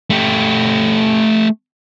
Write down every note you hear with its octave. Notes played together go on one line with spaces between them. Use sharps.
A3 G4